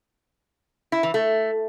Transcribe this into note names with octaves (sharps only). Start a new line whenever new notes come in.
E4
E3
A3